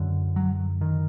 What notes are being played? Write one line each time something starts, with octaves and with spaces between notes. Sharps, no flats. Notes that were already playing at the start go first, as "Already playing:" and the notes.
Already playing: F#2 D3
F#3
D#3